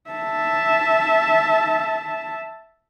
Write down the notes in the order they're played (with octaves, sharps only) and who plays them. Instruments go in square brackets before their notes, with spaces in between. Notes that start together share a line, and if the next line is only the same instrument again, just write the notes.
[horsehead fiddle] E5 A5